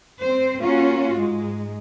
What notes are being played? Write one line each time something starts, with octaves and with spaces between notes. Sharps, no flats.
C4 C5
A#3 C#4 F4 F#4
G#2 G#3